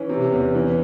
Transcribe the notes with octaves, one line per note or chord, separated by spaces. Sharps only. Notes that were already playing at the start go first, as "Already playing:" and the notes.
Already playing: E3 C#4
C3
E2
E3